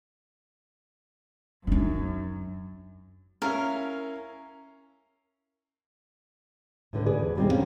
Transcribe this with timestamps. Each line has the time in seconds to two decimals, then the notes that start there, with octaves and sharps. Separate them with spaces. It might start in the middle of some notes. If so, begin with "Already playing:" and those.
1.67 F#2 D4 D#4
3.42 C#4 E4 A#4 F5
6.93 A2 D3 B4
7.06 G#4 B4 D5
7.19 E2
7.36 D#2 B2 G3 G#3 C4
7.51 D3 A#3 C#4 F5